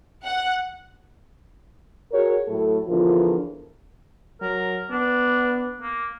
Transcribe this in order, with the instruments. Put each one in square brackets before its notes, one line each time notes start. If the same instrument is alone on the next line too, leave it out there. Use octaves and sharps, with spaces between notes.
[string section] F#5
[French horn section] F#4 G#4 A#4 C#5
A2 F#3 A3 A4
E2 D3 F3 F4 A#4
[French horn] F#3 [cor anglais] A#4
[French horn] B3 [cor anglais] D4
[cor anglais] A#3